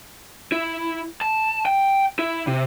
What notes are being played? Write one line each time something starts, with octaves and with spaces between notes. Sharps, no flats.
E4
A5
G5
E4
C3